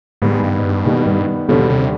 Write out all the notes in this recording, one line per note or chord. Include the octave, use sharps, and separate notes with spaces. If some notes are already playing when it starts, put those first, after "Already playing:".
G#2 D#3 G3 B3
G2
G#2
G2
B2 D#3 G3 B3
G2
D#2 B2 D3 G3
C3